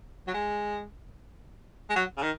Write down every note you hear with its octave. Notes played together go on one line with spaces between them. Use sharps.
F#3
G#3
G#3
F#3
C#3
D#3